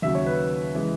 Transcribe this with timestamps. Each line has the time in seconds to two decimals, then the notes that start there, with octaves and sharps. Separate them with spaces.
0.02 D#2 C#3 F#3 E5
0.15 C#5
0.26 B4
0.75 C#3 E3 G#3